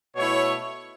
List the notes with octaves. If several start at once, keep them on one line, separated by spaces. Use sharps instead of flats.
B2 A3 E4 C#5